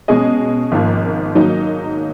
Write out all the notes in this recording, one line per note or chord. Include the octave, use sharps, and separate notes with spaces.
B2 G#3 C#4 G#4 D#5
G#1 G#2 F3 A#3
G#2 D#3 F#3 A#3 D#4